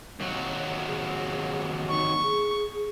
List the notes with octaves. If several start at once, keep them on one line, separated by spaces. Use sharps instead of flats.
D#2 F#3
G#4
D#4 C#6
G#4